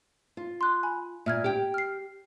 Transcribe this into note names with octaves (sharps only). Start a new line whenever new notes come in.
F4
C6 F#6
G#5 B5
A#2 E5 F6 G#6
G4 G5
F6 C7